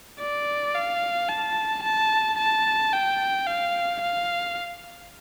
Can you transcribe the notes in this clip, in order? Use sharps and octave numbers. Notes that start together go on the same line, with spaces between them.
D5
F5
A5
A5
A5
G5
F5
F5